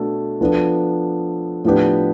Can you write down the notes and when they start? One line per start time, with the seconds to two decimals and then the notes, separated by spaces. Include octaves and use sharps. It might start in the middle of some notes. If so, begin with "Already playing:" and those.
Already playing: B2 A3 D4 A4
0.41 F3 B3 D4 A4
1.64 A2 F3 B3 D4 G4